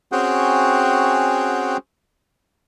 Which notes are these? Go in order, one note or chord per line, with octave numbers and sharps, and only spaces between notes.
C4 C#4 F#4 G#4 F#5 G5